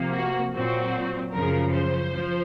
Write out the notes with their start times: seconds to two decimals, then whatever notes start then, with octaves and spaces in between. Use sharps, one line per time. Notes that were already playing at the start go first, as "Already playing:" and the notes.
Already playing: C3 F3 A#3
0.13 F#4
0.54 A#2 F#3 C4 F#4
1.34 F#2 C#3 F3 A#4
1.74 C5
2.14 F3